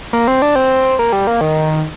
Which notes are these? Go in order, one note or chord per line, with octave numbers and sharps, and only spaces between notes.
A#3
C4
D4
C4
A#3
G3
A#3
D#3